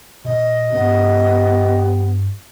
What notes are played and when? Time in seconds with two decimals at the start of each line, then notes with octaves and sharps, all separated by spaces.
0.25 A#2 D#5
0.72 G2 B3 D4 G4